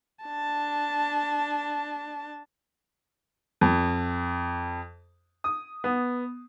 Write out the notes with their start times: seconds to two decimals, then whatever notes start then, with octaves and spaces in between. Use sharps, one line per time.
0.24 D4 A5
3.61 F2
5.44 D#6
5.84 B3